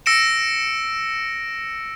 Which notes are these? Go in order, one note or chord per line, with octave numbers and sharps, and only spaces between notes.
E6 A#6 C#7 D7 E7